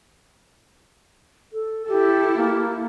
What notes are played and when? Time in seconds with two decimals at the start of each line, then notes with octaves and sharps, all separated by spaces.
1.53 A4
1.88 E4 G4 A4
2.37 A#3